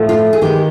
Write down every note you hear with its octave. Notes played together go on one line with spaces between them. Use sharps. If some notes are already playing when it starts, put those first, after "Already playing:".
Already playing: A2 F3 A3
F4
G#4
D#3 G#3 B3 G4